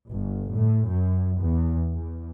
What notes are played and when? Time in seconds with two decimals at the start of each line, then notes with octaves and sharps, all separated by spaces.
0.10 G1
0.53 A2
0.86 F#2
1.41 E2
1.94 E2